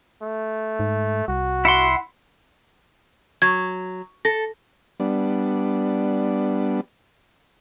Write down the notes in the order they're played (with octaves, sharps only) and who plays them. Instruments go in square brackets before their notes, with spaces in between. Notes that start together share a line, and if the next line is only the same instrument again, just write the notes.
[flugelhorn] A3
[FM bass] G#2
[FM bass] C2 [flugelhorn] F#4
[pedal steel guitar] E4 F#5 C6
[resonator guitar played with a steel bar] F#3 [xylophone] G#6
[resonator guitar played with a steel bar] A4 [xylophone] A#6
[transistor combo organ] G3 B3 D4